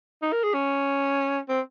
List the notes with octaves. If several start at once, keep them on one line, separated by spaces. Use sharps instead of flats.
D#4
A#4
G#4
C#4
C4